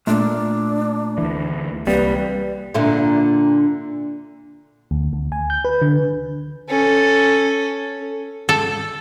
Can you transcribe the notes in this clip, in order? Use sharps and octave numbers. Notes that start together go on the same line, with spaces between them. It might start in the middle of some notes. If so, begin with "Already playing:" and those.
A#2 A3 D4
D2 E3
C2 G3 A#3 C4 B4
A#2 D3 E4
D2
D2
G#5
G6
B4
D3
C#4 A4
A4